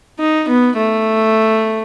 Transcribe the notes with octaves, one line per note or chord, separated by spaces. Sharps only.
D#4
B3
A3